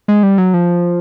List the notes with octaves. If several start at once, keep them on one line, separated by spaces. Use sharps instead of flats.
G#3
G3
F#3
F3